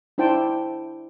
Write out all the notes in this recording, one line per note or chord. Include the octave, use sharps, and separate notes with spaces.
D4 E4 C5 G5 A5